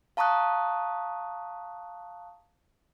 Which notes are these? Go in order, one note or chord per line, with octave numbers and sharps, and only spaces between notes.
F5 A5 A#5 C#6 D#6 F#6